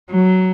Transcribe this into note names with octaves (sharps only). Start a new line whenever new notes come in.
F#3